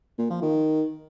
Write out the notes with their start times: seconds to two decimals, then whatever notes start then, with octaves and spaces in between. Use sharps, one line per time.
0.18 A#2
0.30 F3
0.42 D#3